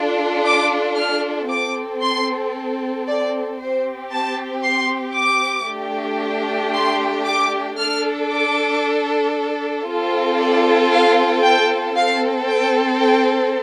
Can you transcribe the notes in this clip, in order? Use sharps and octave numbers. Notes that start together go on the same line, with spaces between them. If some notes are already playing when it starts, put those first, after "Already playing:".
Already playing: D4 F4 A4
D6
F6
C4 A4 D6
C6
D5
C4 G4 C5
A5
C6
D6
A3 D4 G4
C6
D6
D4 A4 F6
D6
C4 F4 A4
D5
F5
G5
C4 A4 F5
G5
G5